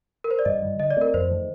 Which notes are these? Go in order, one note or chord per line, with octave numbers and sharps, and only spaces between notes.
A#4
C5
D5
G2 D#5
D#3 G3
D3 D#5
D5
A3 C4 A#4
F2 C5
D#3 A3